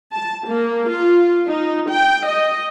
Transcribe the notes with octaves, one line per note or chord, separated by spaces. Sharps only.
A5
A#3
F4
D#4
G5
D#5